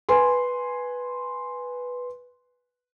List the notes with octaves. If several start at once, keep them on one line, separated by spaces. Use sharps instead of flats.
B4 G#5 C6